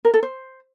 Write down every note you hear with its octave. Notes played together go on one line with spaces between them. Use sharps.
A#4
A4
C5